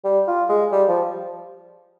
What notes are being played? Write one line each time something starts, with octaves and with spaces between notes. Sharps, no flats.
G3
F4
G#3
G3
F3